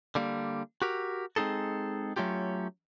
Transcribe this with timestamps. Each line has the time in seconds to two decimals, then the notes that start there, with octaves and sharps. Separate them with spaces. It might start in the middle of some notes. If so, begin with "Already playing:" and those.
0.15 D3 G3 A#3
0.82 F#4 G4 A#4
1.36 G#3 C4 D#4 G#4 A4
2.16 F#3 A3 C#4 F4 G4